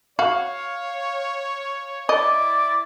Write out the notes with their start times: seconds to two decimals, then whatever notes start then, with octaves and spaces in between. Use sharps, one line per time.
0.19 F#4 C#5 F5
2.09 E4 D5 D#5